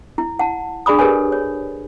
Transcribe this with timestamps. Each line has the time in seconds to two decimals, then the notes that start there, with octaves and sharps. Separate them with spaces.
0.18 E4
0.39 F#5 A5
0.86 D4 G#4 D5 B5 D#6
0.99 G4 G#4 A#4 B4 C#5 G#5
1.32 C#5